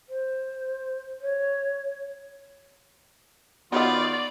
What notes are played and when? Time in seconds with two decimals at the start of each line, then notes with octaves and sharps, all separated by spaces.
0.09 C5
1.22 C#5
3.72 D#3 F#3 B3 F4 D5 D#5